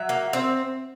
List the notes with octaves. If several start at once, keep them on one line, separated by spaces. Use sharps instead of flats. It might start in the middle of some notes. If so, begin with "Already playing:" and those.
Already playing: F#3 E5
A#3
C4